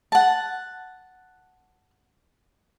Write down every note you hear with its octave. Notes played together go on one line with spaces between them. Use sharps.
F#5 A5